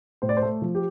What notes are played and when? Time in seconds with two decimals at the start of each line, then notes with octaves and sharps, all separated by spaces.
0.22 A2 C5
0.29 D5
0.37 C5
0.42 A3
0.62 F3
0.75 G4